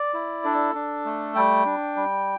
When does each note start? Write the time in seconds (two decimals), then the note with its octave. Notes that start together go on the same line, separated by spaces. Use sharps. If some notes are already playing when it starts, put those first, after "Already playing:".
Already playing: D5
0.14 E4
0.44 D4 A4
0.75 D4
1.05 A3
1.35 G3 G5
1.65 D4
1.96 G3